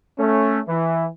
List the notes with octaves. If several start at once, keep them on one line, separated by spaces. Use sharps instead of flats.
A3 C#4
E3